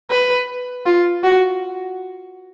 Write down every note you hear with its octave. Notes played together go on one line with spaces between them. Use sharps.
B4
F4
F#4